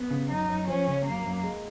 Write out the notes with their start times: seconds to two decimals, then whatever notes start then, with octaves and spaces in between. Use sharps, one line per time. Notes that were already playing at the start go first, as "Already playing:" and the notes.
Already playing: B3
0.11 C#3
0.30 F#2 D#4
0.49 F#2
0.68 F3 C#4
0.87 C#3
1.06 F#2 A#3
1.25 F#2
1.44 G#3